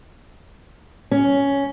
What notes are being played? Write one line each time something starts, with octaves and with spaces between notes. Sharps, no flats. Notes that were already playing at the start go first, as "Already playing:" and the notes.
C#4